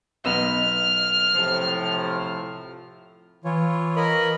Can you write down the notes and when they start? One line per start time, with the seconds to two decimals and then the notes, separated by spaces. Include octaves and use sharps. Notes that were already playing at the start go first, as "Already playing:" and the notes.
0.25 B1 B3 D#5 F6
1.35 A2 C3 F3
3.44 E3 F4 C#5
3.96 A#4 D#5 B5